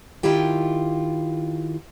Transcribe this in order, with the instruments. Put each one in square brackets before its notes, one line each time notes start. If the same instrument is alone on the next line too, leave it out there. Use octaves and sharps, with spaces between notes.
[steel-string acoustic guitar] D#3 E4 F4 G4 G5